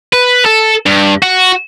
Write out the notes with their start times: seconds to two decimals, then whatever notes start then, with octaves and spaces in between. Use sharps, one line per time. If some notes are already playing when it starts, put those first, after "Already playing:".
0.13 B4
0.46 A4
0.86 G2
1.22 F#4